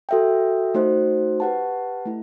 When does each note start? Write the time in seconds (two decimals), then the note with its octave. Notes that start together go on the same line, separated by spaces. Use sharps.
0.09 F#4 A4 E5 G5
0.74 A3 D#4 F#4 C5
1.40 G4 B4 F#5 A5
2.06 A3 E4